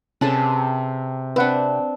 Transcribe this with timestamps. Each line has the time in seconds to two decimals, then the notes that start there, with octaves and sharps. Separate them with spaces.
0.21 C3 C#4 G#4 A4 B4 A5
1.36 C4 D4 B4 F#5